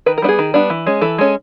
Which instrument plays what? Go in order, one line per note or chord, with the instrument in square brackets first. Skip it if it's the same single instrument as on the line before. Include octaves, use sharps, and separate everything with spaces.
[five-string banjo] D#3 B4
A#4
G3 B3 D4
G#4
D#3
G3 B3 D4
E3
G#3 C#4
E3 A4
G#3 C#4